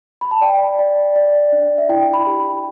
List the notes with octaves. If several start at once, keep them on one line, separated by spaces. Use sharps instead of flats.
B5
A5
D5 G5
D5
D5
D4
E5
E4 G5
B5
G4